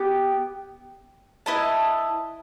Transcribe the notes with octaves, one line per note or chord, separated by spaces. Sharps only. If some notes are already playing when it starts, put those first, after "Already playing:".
Already playing: B3 G4
E4 B4 D#5 A5